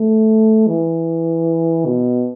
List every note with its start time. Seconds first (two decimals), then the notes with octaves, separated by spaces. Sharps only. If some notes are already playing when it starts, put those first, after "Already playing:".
Already playing: A3
0.67 E3
1.86 B2